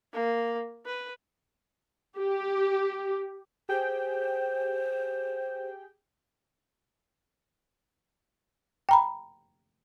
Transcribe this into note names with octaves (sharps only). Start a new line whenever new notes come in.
A#3
B4
G4
G4 G#4 C5 G5
G5 A#5 B5